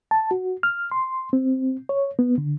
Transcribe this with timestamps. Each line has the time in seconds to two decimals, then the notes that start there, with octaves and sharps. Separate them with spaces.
0.11 A5
0.31 F#4
0.63 F6
0.92 C6
1.33 C4
1.89 C#5
2.19 B3
2.38 D3